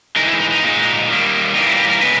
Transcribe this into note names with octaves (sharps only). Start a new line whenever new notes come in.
E3 G#3 D#4 A#4
E4
D#4
D#4
A#2 G#3 D#4
D#3 G3 A#3
E3 G3 A#3 D#4
E4
G4
A#4
C#3 G#3 B3 D#4 B4